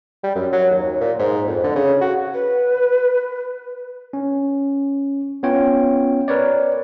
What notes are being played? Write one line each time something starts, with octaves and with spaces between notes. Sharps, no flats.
G3
F#2
F#3
D#2
A#2
G#2
F2
D3
C#3
F#4
B4
C#4
B3 C#4 F4 C#5 G5
A#4 B4 C#5 D5